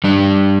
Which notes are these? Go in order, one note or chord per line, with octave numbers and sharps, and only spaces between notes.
G2 G3 D4